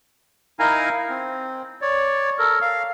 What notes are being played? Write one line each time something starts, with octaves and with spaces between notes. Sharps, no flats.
D#4 E4 A#4 F5 G#5 A#5
C4
C#5 D5
A4 A#4
F5